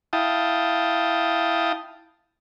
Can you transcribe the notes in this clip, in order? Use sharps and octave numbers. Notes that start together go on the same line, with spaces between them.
E4 F5 G5 A5 D#6